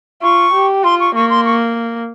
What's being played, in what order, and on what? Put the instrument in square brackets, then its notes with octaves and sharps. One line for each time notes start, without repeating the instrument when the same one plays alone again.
[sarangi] F4 [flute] C#6
[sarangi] G4
[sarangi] F4 [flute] C6
[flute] C#6
[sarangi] A#3 [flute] C#6
[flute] C6
C#6